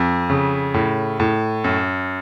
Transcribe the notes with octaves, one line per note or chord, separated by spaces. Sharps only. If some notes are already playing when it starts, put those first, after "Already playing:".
Already playing: F2
C#3
A2
A2
F#2